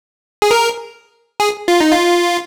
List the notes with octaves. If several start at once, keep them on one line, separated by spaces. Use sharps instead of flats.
G#4
A#4
G#4
F4
D#4
F4